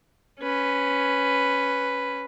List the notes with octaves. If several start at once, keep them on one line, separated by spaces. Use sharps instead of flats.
C#4 B4